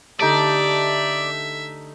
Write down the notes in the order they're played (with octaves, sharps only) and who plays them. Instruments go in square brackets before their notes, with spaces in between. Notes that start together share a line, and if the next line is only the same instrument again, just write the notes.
[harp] D3 G4 [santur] A3 D#4 [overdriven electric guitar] D5 [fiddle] E5